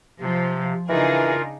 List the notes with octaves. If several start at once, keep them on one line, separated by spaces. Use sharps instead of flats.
C3 F3
C#3 E3 D4 D#4 F4 G#4 A#4